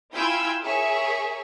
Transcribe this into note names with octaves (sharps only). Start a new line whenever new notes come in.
E4 F4 G5 G#5 B5 E6
G#4 A#4 C#5 E5 G#5 C#6